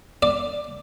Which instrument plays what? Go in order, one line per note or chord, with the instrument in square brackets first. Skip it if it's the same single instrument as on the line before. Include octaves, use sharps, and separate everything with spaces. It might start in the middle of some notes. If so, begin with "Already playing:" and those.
[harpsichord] D5